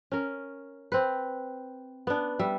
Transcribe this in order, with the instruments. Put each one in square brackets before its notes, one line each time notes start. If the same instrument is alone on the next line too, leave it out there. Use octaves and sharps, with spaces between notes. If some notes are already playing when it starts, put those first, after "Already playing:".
[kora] C#4 A#4
C4 B4
B3 D4
G3 E5